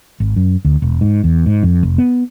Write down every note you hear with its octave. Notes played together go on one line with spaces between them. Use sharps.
G#1
F#2
D2
E1
G#2
E2
G#2
F2
F1
B3